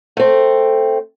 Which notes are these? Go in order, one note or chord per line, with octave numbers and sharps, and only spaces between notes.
A3 C4